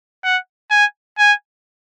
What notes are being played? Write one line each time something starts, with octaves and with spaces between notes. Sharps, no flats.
F#5
G#5
G#5